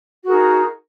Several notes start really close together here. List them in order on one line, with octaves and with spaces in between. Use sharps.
F#4 A#4 G#4 D#4